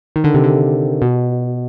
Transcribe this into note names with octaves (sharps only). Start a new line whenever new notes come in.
D#3
D3
C3
D3
B2